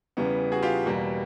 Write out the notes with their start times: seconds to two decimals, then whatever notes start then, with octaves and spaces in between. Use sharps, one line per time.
0.17 E2 C#3 E3 G3 B3
0.52 F#4 G#4
0.63 F4 G4
0.86 E2 B2 G3 A#3